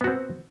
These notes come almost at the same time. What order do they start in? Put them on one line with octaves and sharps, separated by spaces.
B3 F#4 C4